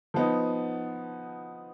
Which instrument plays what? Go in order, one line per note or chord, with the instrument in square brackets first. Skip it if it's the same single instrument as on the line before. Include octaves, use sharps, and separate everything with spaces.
[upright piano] F3 B3 D#4